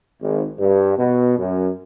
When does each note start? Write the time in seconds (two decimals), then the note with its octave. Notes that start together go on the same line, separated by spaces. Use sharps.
0.22 G#1
0.60 G2
0.98 B2
1.38 F#2